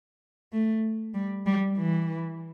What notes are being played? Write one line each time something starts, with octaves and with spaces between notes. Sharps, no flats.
A3
G3
G3
E3